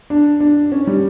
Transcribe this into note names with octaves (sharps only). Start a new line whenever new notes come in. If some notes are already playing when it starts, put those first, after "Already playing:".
D4
D4
C#4
G3